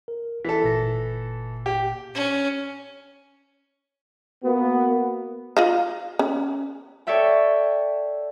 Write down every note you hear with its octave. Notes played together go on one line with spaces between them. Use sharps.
A#4
E3 A4 B6
G1 A#2 A#6
G4
C#4
A#3 B3 F#4
F4 D#5 F5
C#4
A4 C#5 D5 E5 G5